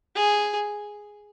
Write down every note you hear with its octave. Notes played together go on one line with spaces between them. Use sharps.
G#4